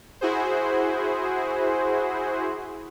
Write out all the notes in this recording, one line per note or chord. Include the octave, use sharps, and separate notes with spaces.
E4 F#4 G#4 C5